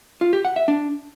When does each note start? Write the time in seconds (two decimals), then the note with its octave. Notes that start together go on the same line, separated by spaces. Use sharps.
0.21 F4
0.33 G4
0.45 F#5
0.56 E5
0.68 D4